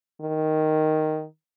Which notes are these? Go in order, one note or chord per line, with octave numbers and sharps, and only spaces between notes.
D#3